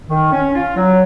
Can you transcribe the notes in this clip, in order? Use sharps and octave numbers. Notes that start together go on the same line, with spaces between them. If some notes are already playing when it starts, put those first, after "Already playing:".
D#3
C#4
F4
F#3